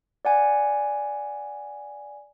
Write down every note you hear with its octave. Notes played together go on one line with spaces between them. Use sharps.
D5 F#5 G#5